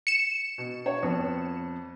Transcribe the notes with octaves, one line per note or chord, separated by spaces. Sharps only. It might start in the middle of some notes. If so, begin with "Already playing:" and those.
C#7 E7
B2
C#5
F2 B3